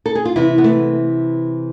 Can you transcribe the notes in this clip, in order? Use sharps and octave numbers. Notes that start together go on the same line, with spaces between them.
A4
G#4
F4
C3 E3 E4
B3
A3